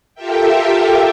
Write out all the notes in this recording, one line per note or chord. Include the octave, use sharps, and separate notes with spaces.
F4 G4 A4 A#4 E5 G5